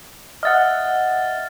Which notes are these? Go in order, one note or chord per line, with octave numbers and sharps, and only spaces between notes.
D#5 E5 F#5 F6 A6